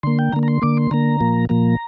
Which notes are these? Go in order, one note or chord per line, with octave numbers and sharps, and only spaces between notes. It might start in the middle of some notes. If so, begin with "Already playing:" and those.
D3 A#3 C6
G5
D3 A#3 A#5
A#5
C6
D3 A#3 D6
C6
D3 A#3 A#5
A#2 F3 A#3
A#2 F3 A#3 A#5